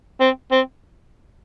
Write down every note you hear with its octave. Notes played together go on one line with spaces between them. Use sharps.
C4
C4